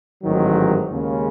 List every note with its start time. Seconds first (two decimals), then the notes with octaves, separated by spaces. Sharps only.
0.23 A1 G#2 D#3 F#3
0.90 D#2 C#3 G#3 C#4